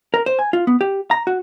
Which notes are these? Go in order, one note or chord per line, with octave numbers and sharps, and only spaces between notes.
A#4
C5
G#5
F4
B3
G4
A#5
F#4